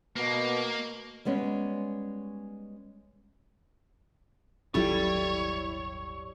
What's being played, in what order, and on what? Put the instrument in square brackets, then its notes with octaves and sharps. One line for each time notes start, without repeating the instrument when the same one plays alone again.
[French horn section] B2 [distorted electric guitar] A#3
[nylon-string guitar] G3 G#3 B3 C#4
[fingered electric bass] D#1 G#1 F#3 [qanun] G3 A4 [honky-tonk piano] E4 [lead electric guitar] C#5